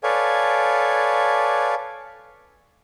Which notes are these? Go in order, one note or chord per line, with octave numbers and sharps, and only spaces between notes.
A4 B4 C#5 D5 F5 G#5